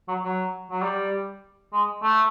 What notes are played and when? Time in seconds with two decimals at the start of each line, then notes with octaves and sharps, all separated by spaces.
0.08 F#3
0.23 F#3
0.71 F#3
0.83 G3
1.73 G#3
2.03 A3